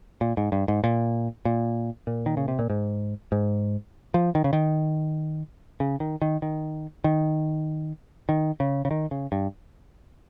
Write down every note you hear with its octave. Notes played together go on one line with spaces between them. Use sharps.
A#2
G#2
G2
G#2
A#2
A#2
A#2
D#3
C#3
C3
A#2
G#2
G#2
F3
D#3
C#3
D#3
C#3
D#3
D#3
D#3
D#3
D#3
C#3
C#3
D#3
C#3
G2